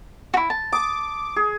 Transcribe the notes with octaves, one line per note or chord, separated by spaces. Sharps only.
E4 F#4
A5
D6 D#6
G#4